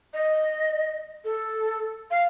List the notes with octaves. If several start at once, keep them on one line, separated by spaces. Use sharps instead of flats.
D#5
A4
F5